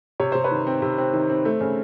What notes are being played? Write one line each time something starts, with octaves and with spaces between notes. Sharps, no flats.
C3 C#5
C3 C5
B4 C#5
D#3
C4
C3
C4
D#3
C4
A3
C#3